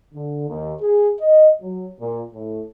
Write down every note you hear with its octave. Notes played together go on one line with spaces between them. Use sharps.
D3
D#2
G#4
D#5
F#3
A#2
A2